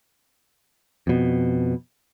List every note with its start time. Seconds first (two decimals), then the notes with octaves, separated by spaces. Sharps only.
1.07 F2 B2